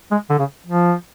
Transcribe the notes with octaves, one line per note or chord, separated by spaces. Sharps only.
G#3
D3
C#3
F3